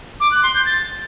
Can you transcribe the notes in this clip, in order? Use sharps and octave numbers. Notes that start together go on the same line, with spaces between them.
D6
F#6
C6
G6
A6